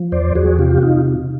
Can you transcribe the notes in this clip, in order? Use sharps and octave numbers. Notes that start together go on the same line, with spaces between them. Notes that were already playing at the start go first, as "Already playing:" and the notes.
Already playing: F3
E2 C5 D5
E2 F#4 G#4
C3 F4 G4
F#4
D#4 F4